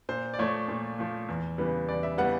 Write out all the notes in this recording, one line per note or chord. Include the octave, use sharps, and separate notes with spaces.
A#2 C5
D5
F3 A3 C#5
A#2
F3 A3
E2
C#3 E3 G3 B3
E2 D5
E5
C#3 E3 G3 B3 F#5